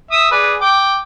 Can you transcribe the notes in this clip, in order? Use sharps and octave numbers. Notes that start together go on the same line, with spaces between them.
E5 D#6
G#4 B4 D5
G5 D6